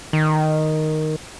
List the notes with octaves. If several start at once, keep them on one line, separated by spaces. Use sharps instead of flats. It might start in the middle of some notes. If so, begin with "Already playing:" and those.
D#3